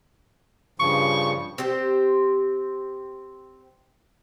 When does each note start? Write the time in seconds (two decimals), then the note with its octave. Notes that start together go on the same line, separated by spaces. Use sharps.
0.80 G2 C#3 F3 C#6
1.58 C4 G4 C5